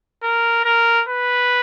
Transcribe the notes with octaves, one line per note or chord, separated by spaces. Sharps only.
A#4
A#4
B4